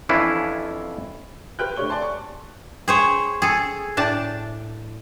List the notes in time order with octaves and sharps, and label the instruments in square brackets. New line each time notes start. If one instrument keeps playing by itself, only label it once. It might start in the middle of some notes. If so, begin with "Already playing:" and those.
[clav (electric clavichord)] F2 E3 C#4 D4 E4 F4
[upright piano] G4 B4 C5 G5 F6 F#6
D3 A3 G4 C#5 C#6 G7
D5 G#5 A5 C6
C#6
[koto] G#4 C5 C#5
G#4 A4
A2 D4 A5